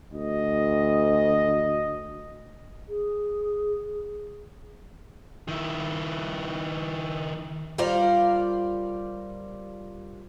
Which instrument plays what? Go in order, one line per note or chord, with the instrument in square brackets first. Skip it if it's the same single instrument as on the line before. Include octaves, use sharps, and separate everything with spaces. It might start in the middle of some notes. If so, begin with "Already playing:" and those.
[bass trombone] D2 [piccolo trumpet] D#5
[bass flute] G#4
[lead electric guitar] D#3 E4
[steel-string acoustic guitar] G3 F4 A#4 C5 D5 F5